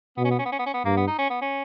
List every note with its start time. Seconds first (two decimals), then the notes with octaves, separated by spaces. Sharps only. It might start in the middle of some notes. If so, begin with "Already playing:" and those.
0.17 B2 B3
0.24 C#4
0.31 B3
0.39 C#4
0.45 B3
0.52 C#4
0.59 B3
0.66 C#4
0.74 B3
0.85 G2 A#3
0.96 B3
1.07 D#4
1.18 C#4
1.30 B3
1.41 C#4